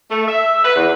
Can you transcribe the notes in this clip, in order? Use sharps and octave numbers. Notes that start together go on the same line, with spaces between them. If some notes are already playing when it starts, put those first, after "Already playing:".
A3
E5
B4
E2